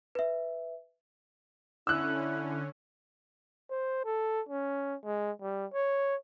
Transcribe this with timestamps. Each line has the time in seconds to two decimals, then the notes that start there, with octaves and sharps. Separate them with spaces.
0.15 B4 E5
1.87 D3 C#4 E4 E6 F#6
3.71 C5
4.05 A4
4.49 C#4
5.04 G#3
5.42 G3
5.74 C#5